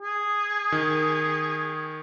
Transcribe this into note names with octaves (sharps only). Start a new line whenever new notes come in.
G#4
D#3